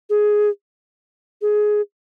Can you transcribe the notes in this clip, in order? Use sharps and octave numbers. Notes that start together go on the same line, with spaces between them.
G#4
G#4